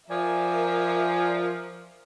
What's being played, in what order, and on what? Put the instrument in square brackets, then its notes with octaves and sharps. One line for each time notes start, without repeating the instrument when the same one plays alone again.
[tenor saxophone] F3 [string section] A#4 E5 [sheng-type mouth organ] D5 G#5